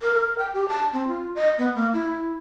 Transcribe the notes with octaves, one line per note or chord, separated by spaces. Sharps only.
A#4
A#4
G5
G4
A5
C4
F4
D#5
B3
A#3
E4